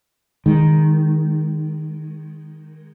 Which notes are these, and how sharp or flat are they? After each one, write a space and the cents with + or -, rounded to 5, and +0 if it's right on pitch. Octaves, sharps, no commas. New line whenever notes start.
D#3 +0 G#3 -15